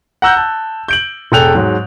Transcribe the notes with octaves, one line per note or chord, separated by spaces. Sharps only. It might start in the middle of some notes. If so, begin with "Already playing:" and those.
F#5 A#5 E6 F#6 G6
A5
G6 D7 F#7
E1 G#4 A4 G5 F#6 F7
G#2 F#3